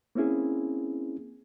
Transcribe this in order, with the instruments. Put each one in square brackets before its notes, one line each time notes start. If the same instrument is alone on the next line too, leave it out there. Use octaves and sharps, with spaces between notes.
[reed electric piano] A#3 C4 C#4 E4 G#4